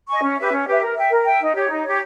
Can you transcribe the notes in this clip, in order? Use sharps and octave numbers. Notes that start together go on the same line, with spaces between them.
D#5 G#5 C#6
C#4
G4 B4 E5
C#4
G4 B4 E5
A#4
E5 G5
A#4
E5 G5
D#4
G4 C#5
D#4
G4 C#5